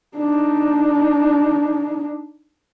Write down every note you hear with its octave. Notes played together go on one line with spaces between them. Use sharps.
D4 D#4